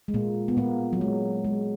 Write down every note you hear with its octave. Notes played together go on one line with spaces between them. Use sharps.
G#3
A#2 A#3
B3
A#2 A#3
F#3
G#3
G#3